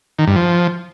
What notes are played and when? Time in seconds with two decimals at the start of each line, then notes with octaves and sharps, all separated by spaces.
0.19 D#3
0.27 G2
0.36 F3